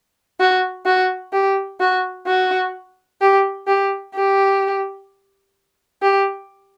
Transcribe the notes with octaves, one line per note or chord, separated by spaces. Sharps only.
F#4
F#4
G4
F#4
F#4
G4
G4
G4
G4